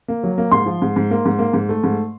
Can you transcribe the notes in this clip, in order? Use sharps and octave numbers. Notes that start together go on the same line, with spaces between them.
A#3
F#3
A#3
G#2 C6
F3
G#2
G#2
A#3
G#2
A#3
G#2
A3
G#2